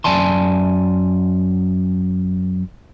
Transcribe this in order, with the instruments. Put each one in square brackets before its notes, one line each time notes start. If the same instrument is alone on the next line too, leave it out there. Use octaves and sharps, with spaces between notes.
[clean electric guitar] F#2 D5 G#5 A5 C6